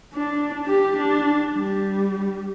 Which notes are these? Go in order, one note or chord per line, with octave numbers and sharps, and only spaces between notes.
D4
G4
D4
G3